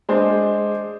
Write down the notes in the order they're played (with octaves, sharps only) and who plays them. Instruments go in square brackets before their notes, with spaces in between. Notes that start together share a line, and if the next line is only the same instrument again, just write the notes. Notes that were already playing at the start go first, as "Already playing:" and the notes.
[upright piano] G#3 D4 G#4 C5